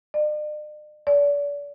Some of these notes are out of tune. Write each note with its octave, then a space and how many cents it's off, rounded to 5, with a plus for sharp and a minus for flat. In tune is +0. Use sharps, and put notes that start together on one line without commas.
D5 +45
D5 -35